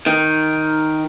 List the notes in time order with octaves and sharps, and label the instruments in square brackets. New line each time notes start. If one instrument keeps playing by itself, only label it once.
[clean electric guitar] D#3